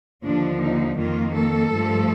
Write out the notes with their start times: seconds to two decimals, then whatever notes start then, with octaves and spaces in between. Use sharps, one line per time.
0.24 D#2 D3 F3 D4
0.62 D#4
0.98 F2 D#3 A#3 F4
1.35 A4
1.72 G2 F3 A3